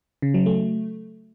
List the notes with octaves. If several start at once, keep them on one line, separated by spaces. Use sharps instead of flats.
C#3
F#3
A3